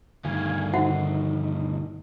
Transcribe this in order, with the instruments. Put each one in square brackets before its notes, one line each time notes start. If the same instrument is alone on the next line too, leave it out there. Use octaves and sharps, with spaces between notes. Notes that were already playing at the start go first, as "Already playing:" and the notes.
[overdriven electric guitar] D2 G2 [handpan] D#3 [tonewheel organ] F5 G#5
[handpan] D#3 [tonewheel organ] D#4 [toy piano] F#4 C5 F#5